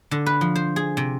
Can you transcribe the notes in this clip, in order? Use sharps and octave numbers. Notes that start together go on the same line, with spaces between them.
D3
B4
F3
C5
G#4
C3